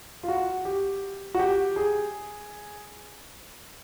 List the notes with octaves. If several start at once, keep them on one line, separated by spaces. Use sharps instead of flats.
F4
F#4
G4
F#4
G4
G#4